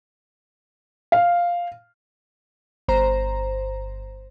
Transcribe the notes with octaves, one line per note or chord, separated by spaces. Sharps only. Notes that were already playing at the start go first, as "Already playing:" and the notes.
F5
G1 C5 A#5